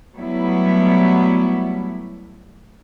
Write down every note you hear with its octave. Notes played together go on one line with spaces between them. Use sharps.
F#3 G3 A3 B3 E4